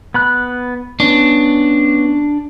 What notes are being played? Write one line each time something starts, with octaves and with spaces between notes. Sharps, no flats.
B3 B5 F#6
B3 C#4 D4